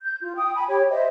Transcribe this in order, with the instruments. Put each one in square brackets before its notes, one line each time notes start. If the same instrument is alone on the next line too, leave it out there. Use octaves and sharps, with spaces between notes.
[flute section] G6
F4
G5 D#6
G#5 B5
G4 C#5 G5
C5 D#5 E5